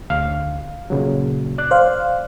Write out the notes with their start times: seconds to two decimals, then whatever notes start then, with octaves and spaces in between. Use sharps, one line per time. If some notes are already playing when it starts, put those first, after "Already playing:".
0.10 D2 F5
0.90 A#2 C#3 F#3
1.58 D5 F#6
1.71 C5 F5